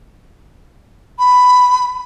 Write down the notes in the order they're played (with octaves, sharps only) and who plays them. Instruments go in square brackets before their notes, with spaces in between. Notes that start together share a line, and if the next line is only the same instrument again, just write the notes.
[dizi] B5